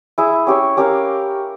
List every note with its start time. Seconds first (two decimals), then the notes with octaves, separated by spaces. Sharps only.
0.18 E4 G#4 E5
0.47 C#4 G4 C#5
0.77 C#4 G4 A#4 F5